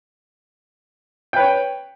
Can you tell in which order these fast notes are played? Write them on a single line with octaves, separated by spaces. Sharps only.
G5 B4 C#5